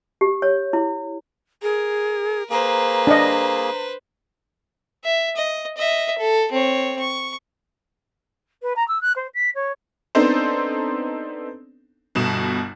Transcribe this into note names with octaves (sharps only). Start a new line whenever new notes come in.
G4
C#5
E4
G#4 A#4
A#3 G#4 B4 C5 A#5
D4 D#5
E5
D#5
D#5 E5
A4
C4 C#5
C#6
B4
A#5
E6
F#6
C5
B6
C#5
B3 C4 D4 D#4 A4 C5
G1 B2 E7